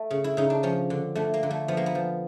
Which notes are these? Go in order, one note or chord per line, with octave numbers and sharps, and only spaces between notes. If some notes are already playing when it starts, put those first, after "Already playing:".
Already playing: A3
C#3
E4
C#3 D#4
D4
F3 C#4
D3
D3 A3
A#3
D3
A3
F3 B3
A#3
B3
F3